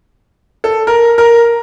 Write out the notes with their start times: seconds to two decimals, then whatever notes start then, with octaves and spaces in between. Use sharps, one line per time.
0.64 A4
0.87 A#4
1.18 A#4